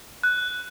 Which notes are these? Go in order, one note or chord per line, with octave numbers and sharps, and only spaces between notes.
F#6